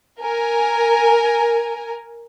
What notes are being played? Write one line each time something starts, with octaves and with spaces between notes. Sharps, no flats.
A#4 G#5